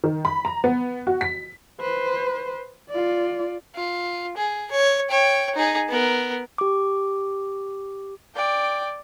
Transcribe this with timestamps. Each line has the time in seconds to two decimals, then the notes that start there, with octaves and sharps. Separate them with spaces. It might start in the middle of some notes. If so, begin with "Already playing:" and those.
0.04 D#3
0.25 B5
0.45 A#5
0.64 B3
1.07 F#4
1.21 B6
1.81 B4 C5
2.90 F4 D5
3.76 F4
4.37 G#4
4.71 C#5
5.10 C#5 G5
5.55 D#4 G#4
5.89 B3 A#4
6.58 G4 D6
8.35 D5 G5